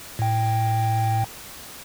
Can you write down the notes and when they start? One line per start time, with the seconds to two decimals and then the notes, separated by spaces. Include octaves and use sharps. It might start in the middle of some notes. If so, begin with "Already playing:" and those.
0.19 A2 G5